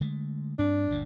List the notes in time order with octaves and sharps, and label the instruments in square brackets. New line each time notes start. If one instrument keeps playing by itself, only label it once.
[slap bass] D3 G#3 A3
[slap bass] G2 C4 [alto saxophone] D4
[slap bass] G1 D2 A#2